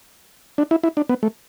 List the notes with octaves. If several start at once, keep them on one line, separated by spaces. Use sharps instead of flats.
D4
E4
E4
D4
B3
A3